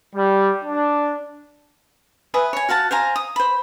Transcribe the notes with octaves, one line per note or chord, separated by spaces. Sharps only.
G3
D4
B4 E5 G#5 D#6
C#5 G#5
F#4 F5 F#5 A5
C5 F5 G#5 A#5
D#6
C5 B5